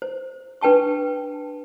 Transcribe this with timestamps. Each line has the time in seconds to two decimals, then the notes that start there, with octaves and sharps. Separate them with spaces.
0.02 C5
0.61 D4 B4 G5 A5 C#6